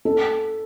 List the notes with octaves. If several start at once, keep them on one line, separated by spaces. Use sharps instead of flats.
A4